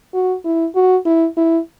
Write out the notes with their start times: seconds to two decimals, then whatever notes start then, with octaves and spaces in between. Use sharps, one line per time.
0.14 F#4
0.45 E4
0.75 F#4
1.05 E4
1.37 E4